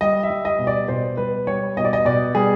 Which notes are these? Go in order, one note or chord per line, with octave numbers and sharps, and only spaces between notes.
G3 D#5
E5
G3
D#5
B2
D5
B2 C5
G3 B4
G3 C#5
B2 D#5
D5
D#5
B2 D5
G3 G#4